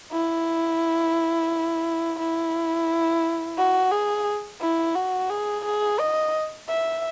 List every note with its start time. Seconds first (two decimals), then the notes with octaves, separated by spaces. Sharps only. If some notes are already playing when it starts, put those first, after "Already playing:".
0.12 E4
2.19 E4
3.58 F#4
3.92 G#4
4.61 E4
4.96 F#4
5.30 G#4
5.65 G#4
5.99 D#5
6.69 E5